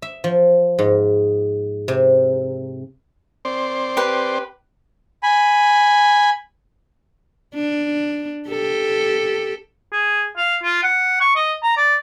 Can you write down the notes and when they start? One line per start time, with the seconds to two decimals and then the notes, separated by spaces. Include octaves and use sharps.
0.02 E5
0.24 F3
0.79 G#2
1.88 C3
3.45 C4 C5 D5
3.97 G4 B4
5.23 G#5 B5
7.54 D4
8.49 G4 A4
9.92 G#4
10.37 F5
10.63 F4
10.83 F#5
11.21 C#6
11.36 D#5
11.63 A#5
11.77 D5